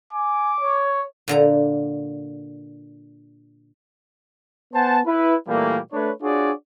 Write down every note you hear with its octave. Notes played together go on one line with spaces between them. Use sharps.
G#5 D6
C#5
A#2 D3 A#5
B3 C5 F#5 G#5 A5
E4 B4
A#2 E3 G3 A3 A#3
A3 D4 B4 C#5
D4 F4 F#4 G#4 C#5 D5